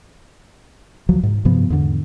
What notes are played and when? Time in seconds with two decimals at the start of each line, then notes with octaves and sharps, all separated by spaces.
1.09 D2 F3 F#3
1.23 G#2
1.45 G2 C3 F3 B3
1.70 E2 G#2 D3